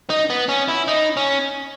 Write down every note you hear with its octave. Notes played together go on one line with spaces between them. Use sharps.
D#4
B3
C#4
E4
D#4
C#4